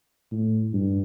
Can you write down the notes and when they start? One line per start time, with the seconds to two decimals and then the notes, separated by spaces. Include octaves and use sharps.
0.31 A2
0.73 G2